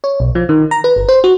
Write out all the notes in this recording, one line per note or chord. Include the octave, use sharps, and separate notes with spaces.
C#5
B1
F3
D#3
A#5
B4
G1
C5
F#4